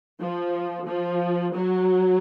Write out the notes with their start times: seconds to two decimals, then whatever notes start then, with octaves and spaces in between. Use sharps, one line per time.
0.22 F3
0.88 F3
1.54 F#3